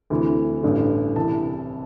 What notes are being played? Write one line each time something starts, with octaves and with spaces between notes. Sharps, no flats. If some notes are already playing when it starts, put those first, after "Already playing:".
D2 C3 E3
A1 G2 D3
C2 C3 E3 A5